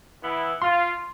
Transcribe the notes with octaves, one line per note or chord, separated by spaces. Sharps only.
E3 B3 E4
F4 C6